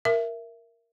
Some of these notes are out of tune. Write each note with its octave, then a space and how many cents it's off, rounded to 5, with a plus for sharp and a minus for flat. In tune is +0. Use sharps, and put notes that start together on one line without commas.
A#4 +0 E5 +15